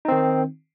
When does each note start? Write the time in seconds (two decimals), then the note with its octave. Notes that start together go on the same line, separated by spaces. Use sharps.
0.05 D#4
0.08 C4
0.12 D#3